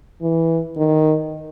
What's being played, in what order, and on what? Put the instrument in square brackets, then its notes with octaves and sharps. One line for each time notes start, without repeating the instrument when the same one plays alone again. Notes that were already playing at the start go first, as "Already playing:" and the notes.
[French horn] E3
D#3